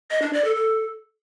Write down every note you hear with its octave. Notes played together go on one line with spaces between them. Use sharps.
D#5
D4
D5
A4
A4